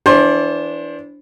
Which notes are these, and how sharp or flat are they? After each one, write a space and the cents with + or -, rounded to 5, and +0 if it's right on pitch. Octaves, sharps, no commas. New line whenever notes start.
E3 +0 D4 -20 C5 +25